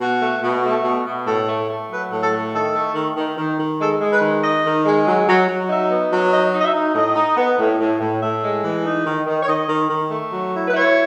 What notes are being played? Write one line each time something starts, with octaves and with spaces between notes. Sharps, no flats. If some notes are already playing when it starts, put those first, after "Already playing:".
B2 F#4
A3
B2
A3
B2
B2
A2 A4
A3
A3
F#3 B4
A2
A4
A3
D#3 A4
A3
D#3
D#3
D#3
D#3
G#3 A4
G#3
B4
D#3
D#4 D#5
D#3
G#3
F#3
F#3
F#3
D#4 E5
B3
F#3
D#4 D#5
D#4 D#5
E5
D#4
A2 D#5
D#4
B3
A2
A2
A2
A2 E5
G#3
E3
D#4
D#3
D#3
C#5
D#3 D#5
D#3
D#3
A3
F#3
E4
B4
E4 C#5